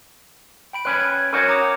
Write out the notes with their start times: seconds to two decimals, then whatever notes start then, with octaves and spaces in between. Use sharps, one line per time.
0.73 G5 B5 D7
0.85 C#4 B4 F#6
1.00 G#6
1.33 C#4 D#4 F#4 A#4 C#5
1.49 A#5 D6 D#6